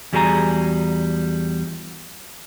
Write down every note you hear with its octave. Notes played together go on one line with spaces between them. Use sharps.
E2 G3 F#4 G#4 G#5 A#5